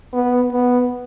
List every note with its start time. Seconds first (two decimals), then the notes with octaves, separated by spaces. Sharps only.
0.13 B3
0.52 B3